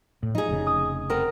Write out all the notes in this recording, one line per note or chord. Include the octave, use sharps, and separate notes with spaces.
A2
F3 D#4 G#4
F1 C#3
D#6
B3 C4 A#4